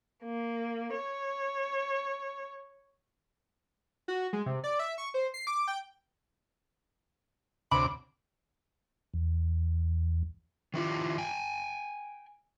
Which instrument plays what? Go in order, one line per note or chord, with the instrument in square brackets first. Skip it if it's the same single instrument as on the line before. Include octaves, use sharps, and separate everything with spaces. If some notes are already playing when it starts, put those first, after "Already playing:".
[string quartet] A#3
C#5
[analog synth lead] F#4
G#3
C3
D5
E5
C#6
C5
C7
D6
G5
[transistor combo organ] D2 C3 D6 [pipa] C#5 B5
[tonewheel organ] E2
[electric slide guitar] D#3 E4 F4 G4
G5 G#5